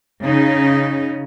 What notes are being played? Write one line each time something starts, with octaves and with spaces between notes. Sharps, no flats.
C#3 D#4